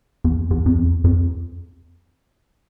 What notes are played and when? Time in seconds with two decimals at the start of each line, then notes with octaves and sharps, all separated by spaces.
0.24 E2
0.51 E2
0.66 F2
0.77 E2
1.04 F2